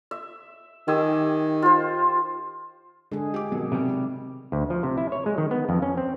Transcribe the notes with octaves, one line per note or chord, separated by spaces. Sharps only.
E5
D#3 G4 G#5 E6
F4 C5
D3 G#3 G#4
G4 G#4 D6
B2 D#3 F#3
C3 G3
D2
F3
C3
E4
C#5
G#3
D#3
B3
F2
C#4
C4